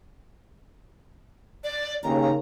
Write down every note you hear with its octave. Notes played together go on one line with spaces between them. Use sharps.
D5
D#2 C#3 A#5